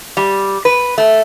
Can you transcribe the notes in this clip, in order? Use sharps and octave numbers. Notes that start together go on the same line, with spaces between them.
G3
B4
A3